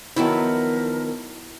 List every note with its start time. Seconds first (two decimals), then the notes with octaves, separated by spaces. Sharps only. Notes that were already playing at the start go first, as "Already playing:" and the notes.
0.16 D#3 F3 F#3 B3 E4 A#4